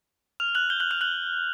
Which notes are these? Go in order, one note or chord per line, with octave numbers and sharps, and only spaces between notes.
F6 F7
F#6 F#7
G6 G7
F#6 F#7
F6 F7
F#6 F#7